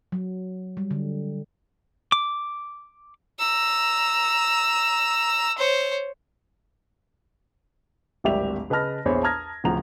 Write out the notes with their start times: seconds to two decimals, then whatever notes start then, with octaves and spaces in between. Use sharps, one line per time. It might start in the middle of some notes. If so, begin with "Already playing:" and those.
0.12 F#3
0.77 G3
0.91 D3
2.12 D6
3.39 A#5 E6
5.58 C5 C#5
8.24 D1 G#1 G3 G4 E5 F7
8.70 C#3 B4 D#5 A5 F6 A#6
9.05 A#1 E2 G#4 C5 C#5 B5
9.23 A5 A#5 D#6 F6 G#6 A#6
9.64 D1 C#3 F3 F#5 A#5 F7